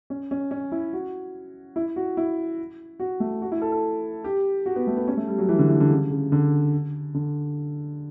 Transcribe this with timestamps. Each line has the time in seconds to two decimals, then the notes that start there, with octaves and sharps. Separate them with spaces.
0.10 C#4
0.31 C#4
0.51 C#4
0.72 E4
0.93 F#4
1.76 E4
1.96 F#4
2.17 E4
3.00 F#4
3.20 A3
3.42 F#4
3.52 E4
3.62 A4
3.72 A4
4.24 G4
4.66 F#4
4.76 B3
4.87 A3
4.97 B3
5.07 C#4
5.17 A3
5.28 G3
5.38 F#3
5.49 E3
5.58 D3
5.69 E3
5.80 D3
5.90 C#3
6.10 C#3
6.32 D3
7.14 D3